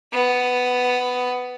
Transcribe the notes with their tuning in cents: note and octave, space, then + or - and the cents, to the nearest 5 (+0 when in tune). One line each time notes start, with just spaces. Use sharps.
B3 +10